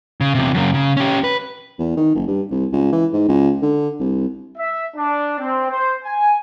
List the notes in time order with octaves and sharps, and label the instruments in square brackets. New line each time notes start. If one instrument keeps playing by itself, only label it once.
[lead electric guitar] C#3
E2 C3
F#2 C#3
C#3
C#4 G4
B4
[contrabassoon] E2
D#3
F#1
G2
C2
C#2
E3
G#2
C#2
D3
C2
[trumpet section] E5
D4
C4
C5
G#5